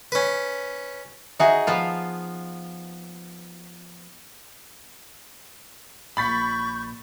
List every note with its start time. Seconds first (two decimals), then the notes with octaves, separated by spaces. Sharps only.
0.12 C#4 B4
1.40 D#4 F#4 G#4 D#5 E5 G#5
1.67 F3 B3 F4
6.17 A#1 A#2 B5 C#6 G6 A6 B6